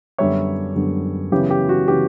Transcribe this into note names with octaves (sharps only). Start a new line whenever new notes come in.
F#2 D3 G3 B3 C#5 E5
F#2 D3 G3 B3
F#2 C#3 E3 B3 G4
G4
F#4
C#3 E3 B3 G4